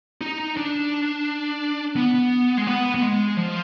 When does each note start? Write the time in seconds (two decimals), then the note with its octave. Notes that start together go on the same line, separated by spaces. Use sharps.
0.21 D#4
0.57 D4
1.96 B3
2.58 G#3
2.67 B3
2.95 B3
3.02 G#3
3.37 F3